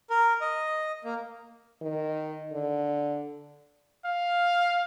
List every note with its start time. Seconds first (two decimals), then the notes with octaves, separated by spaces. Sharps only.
0.10 A#4
0.41 D#5
1.05 A#3
1.82 D#3
2.52 D3
4.06 F5